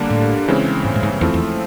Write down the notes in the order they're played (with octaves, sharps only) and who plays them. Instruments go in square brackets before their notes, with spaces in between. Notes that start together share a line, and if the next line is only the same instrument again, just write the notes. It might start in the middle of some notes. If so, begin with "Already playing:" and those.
Already playing: [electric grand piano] D3 G3 A#3 D4
[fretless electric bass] A2
[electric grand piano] C#3 E3 G#3 C4
[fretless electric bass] G#2
A2
G#2
[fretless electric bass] E2 [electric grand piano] F3 A3 C4 E4
[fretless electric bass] E2